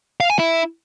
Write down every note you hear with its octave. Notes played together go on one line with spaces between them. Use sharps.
F5
G#5
E4